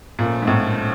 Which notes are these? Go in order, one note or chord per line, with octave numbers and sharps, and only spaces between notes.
A#2 F3 A3 C#4
G#2
A2